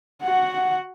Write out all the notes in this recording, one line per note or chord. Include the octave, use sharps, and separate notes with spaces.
F#4 F#5